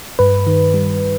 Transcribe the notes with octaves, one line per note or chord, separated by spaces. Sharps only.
G2 B4
D#3
G3